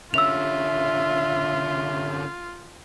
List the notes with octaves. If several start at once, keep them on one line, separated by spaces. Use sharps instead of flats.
D3 C#4 F4 E5 E6 F7